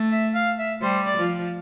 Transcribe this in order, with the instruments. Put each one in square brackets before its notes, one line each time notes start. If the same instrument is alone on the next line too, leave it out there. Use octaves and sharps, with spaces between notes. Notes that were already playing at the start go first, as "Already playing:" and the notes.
Already playing: [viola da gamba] A3
[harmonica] E5
F5
E5
[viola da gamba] G3 [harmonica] C5
[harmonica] D5
[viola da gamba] F3